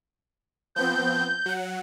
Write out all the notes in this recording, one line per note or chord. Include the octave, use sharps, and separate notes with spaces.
F3 B3 C4 G6
F#3 F#5